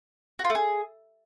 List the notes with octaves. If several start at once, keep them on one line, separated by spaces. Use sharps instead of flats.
F#4
F4
A3
G#4